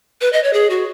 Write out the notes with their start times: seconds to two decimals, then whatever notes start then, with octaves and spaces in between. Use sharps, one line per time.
0.21 B4
0.33 D#5
0.44 C#5
0.53 G#4
0.70 F#4